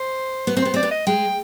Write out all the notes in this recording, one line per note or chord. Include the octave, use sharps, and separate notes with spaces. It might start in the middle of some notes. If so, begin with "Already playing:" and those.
Already playing: C5
B3
C4
B3 C5
C4 D5
B3
D#5
G#3 G5